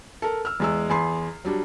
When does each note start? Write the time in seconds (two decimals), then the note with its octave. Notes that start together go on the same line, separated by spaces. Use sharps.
0.22 A4 A#4
0.45 E6 F6
0.60 E2 G#3 E6
0.89 E2 G#4 G#5 B5 C6 C7
1.45 F#3 G3 D4